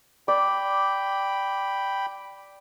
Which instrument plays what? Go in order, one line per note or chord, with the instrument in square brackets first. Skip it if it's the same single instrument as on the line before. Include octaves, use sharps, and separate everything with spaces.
[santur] D5 [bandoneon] G5 B5